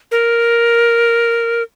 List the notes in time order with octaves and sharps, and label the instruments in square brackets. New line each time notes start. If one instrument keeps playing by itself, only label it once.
[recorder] A#4